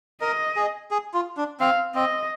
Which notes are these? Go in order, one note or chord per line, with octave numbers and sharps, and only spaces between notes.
A#4 D#5
G#4
G#4
F4
D4
C4 F5
C4 D#5